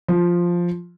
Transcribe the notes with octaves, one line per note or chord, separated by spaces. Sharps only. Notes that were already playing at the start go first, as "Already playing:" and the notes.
F3